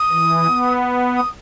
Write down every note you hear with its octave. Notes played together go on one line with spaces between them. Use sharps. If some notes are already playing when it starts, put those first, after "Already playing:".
Already playing: D#6
E3
B3
D#6